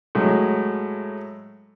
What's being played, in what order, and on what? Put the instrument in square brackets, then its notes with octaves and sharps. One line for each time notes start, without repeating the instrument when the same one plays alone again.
[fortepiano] A2 F#3 G#3